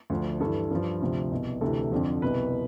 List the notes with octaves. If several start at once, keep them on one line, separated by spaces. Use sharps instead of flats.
D2 D3 F3
G2 E3 A4
G2 F3
D2 C3 F3
C2 B2
D2 C3 E3 A4
F2 D3 F3
C2 B2 B4